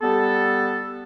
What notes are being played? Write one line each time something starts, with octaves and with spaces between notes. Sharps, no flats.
G3 B3 A4